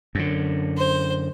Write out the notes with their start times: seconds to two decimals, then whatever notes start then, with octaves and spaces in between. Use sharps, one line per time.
0.15 F#2 D3
0.77 C5